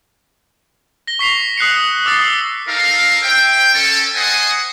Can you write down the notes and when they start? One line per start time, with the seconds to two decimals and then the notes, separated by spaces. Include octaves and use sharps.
1.07 A#6 G7
1.19 C#6 B6 C7 F7
1.57 D#6 F#6 C7 C#7
2.06 D6 E6 A6 C7 G7
2.19 D#6 C7
2.68 D#4 A4 A#4 F5
3.23 C5 E5 G5
3.74 C#4 A4
4.15 C5 D#5 F#5 G#5 D#6